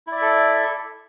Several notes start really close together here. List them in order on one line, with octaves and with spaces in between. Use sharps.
E4 D5 E5 A4